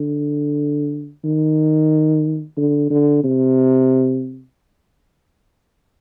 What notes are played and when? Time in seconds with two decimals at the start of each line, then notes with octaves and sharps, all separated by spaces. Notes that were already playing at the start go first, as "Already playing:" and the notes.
Already playing: D3
1.24 D#3
2.57 D3
2.90 D3
3.24 C3